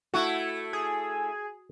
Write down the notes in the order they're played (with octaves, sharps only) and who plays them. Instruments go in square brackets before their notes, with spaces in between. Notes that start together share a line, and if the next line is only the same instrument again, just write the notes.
[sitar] A3 E4 [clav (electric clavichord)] F#4
[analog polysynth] G#4